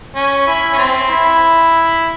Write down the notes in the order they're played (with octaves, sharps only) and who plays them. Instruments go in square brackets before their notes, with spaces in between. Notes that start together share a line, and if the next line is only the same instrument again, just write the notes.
[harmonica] C#4
E4
C#4
C4
E4